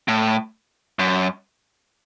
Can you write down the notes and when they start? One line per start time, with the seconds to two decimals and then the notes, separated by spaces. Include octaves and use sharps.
0.08 A2
0.99 F#2